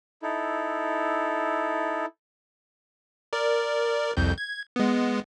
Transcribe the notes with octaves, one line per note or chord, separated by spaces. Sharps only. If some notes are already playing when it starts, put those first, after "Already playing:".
D#4 E4 A4
A#4 D5
C2 F2 G6
G#6
G#3 B3